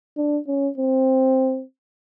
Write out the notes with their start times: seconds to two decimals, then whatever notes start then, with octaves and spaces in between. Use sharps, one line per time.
0.17 D4
0.48 C#4
0.78 C4